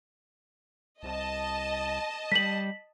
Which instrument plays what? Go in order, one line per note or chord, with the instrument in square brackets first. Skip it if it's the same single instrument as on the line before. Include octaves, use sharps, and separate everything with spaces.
[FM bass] C2 [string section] D#5 A5
[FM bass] G3 [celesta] B6 F#7